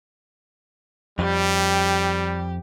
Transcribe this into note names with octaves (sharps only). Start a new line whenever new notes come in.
F2 G3 G4